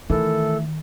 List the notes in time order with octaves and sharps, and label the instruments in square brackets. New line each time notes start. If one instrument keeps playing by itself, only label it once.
[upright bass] D#3 [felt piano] E3 A#4 [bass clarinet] A3 [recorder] A4